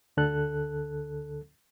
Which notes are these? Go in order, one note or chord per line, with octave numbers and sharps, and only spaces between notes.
D2 D3 A4 F#6